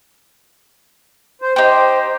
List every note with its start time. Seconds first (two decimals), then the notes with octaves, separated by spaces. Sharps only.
1.42 C5
1.56 D#4 G4 C5